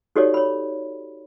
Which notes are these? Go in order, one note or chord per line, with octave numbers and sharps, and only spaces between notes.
D#4 F#4 G4 A4 C#5 D5
C#5 B5